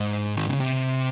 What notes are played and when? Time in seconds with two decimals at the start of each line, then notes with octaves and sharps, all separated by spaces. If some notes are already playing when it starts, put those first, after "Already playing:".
Already playing: G#2
0.36 D#3
0.48 C#3
0.60 C3